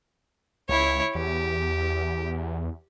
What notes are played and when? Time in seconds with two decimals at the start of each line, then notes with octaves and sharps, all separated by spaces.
0.69 C#2 E4 C#5
1.15 E2 G4